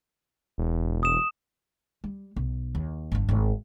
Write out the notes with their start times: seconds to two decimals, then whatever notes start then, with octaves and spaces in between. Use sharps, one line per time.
0.58 E1
1.03 D#6 E7
2.04 G3
2.36 B1
2.75 D#2
3.12 G1 G2
3.29 G#1 F#3